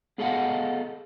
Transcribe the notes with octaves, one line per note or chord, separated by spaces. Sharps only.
B3 G#4 A4 D#5 F5 F#5